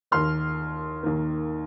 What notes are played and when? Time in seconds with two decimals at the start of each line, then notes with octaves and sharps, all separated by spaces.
0.11 D#2 D#3 A#3 C6 F6
1.03 D#2 D#3 A#3